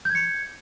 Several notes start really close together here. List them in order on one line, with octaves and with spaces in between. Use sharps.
G6 G#6 C#7